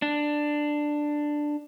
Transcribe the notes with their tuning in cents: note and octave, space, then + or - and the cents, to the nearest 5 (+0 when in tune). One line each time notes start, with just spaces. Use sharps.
D4 +10